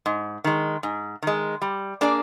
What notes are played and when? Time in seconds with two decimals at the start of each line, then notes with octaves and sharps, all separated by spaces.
0.06 G#2
0.44 D#3 G#3
0.83 G#2
1.22 D#3 G#3
1.62 G3
2.01 A#3 D4 G#4 D5